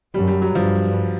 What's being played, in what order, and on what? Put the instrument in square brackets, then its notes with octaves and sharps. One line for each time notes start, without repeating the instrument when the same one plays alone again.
[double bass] F#2 [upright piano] G3
[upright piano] G3
F#3
[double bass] G2 [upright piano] F3